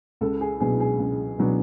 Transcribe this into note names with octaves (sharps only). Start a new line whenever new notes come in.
C#2 A4
G#4
B2 F#3 B3 D4 G#4
G#4
C#2
B2 F#3 B3 D4